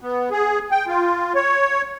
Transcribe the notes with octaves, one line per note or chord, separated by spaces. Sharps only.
B3
G#4
G5
F4
C#5